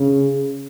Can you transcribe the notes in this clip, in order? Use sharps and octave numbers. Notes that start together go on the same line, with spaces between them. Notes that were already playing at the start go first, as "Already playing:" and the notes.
Already playing: C#3